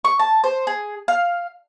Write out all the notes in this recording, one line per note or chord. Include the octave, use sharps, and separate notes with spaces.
C#6
A5
C5
G#4
F5